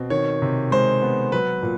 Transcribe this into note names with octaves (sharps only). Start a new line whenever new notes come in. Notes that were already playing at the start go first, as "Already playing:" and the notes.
Already playing: B2 C4
D#3 C#5
C3
G#3 C5
B3
F#3 B4
A#2